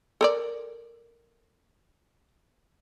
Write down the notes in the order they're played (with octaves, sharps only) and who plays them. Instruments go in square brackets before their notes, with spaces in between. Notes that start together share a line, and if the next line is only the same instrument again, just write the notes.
[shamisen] A4 A#4 D5